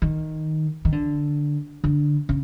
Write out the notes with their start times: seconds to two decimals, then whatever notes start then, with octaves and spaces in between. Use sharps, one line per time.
0.02 D#3
0.85 D#3
0.92 D3
1.84 D3
2.29 C#3